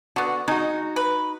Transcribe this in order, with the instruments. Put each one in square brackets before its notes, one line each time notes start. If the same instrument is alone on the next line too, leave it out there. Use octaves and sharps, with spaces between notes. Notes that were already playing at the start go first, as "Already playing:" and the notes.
[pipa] D3 B3 [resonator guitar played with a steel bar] F#4
[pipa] G#3 [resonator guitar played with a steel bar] D#4 F#4
[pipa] B4